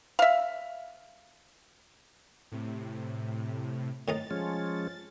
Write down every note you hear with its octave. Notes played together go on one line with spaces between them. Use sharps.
E5 F5
A2 C3
A2 D#3 D#4 A6
F3 G#3 C#4